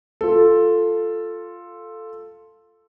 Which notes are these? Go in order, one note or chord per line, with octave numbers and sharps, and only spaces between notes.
F4 A4